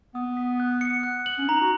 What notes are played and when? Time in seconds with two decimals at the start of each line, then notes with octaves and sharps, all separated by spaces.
0.15 B3 D#6
0.37 B6
0.60 F#6
0.81 C#7
1.03 F#6
1.26 F#7
1.38 C#4
1.49 D#4 A#5
1.61 F#4